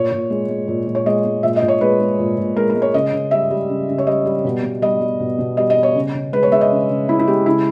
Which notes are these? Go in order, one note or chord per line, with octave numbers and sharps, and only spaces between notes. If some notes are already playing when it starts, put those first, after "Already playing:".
Already playing: A#2 C#5
A#2
G#3
G#3
A#2
A#2
C#5
G#3 D#5
G#3
A#2 E5
D#5
A#2
C#5
G#3 B4
G#3
A#2
A#2
G#3 A#4
A#4
G#3
C#5
C#3 D#5
C#3
G3 E5
G3
C#3
C#3
C#5
G3 D#5
G3
B2
B2
G3 D#5
G3
B2
B2
G3 D#5
D#5
G3
C#5
C#3
C#3
G#3 B4
C#5
G#3 E5
D#5
C#3
C#3
G#3 E4
E4
G#3 G4
C#3 E4